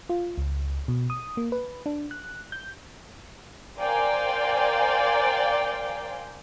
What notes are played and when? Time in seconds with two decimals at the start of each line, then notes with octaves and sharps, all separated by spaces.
0.09 F4
0.38 C#2
0.88 B2
1.10 D#6
1.37 A#3
1.52 B4
1.86 D4
2.11 F#6
2.52 G6
3.78 A#4 C5 D5 F5 G5 G#5